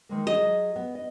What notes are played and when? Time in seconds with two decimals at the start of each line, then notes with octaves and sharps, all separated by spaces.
0.09 D#3 G#3 A#3
0.27 F#3 G#4 D#5
0.76 B3
0.95 D#5